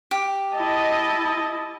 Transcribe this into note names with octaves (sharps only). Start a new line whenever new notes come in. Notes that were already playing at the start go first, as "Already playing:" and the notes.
G4
E4 D#5 A5